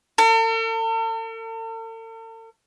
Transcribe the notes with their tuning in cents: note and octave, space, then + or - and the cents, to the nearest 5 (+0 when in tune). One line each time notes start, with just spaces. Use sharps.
A4 +45